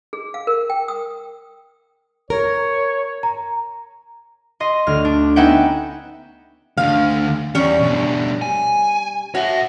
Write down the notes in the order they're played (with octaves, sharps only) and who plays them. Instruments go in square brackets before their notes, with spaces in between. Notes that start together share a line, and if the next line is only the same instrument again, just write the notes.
[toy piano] G#4
F5
A#4
G5
D#6
[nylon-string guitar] A#4 [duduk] C#5
[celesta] A#5
[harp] D#5 C6
D2 F6
D4
B3 C#4 D#4 E5 F#5 G5
[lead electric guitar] D2 D3 [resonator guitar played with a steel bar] F5
[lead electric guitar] E2 [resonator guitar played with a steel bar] G3 C#4 C#5
[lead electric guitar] B2 D4
G#5
[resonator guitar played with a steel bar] F#4 [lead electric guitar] C#5 E5